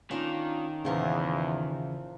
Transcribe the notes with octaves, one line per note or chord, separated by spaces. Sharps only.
D#3 A#3 C#4 D4 F4
E2 A#2 C#3 E3 F3 A#4